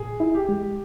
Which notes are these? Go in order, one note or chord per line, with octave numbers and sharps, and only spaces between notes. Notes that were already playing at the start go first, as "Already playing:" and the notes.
Already playing: A#2 G#4
E4
G4
G#3